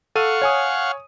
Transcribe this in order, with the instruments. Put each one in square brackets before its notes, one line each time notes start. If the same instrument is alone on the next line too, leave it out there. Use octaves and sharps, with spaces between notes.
[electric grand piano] A4 D#7 [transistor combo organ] F5 F#5 C#6
[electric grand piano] C#5 G#5 D#6